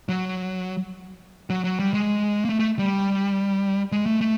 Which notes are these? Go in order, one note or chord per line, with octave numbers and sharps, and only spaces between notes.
F#3
F#3
F#3
G3
G#3
A#3
A3
A3
G3
G#3
A3
A3